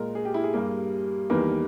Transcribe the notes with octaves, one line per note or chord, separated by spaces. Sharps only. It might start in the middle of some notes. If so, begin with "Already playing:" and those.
Already playing: A#2 G#3 A#4
G#4
G4
E4
G#4
G2 G3 A#3
E2 D#3 G3 A#3 B4